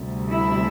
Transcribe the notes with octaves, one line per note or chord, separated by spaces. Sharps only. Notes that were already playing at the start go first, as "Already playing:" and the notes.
Already playing: D2 C3 G3
E4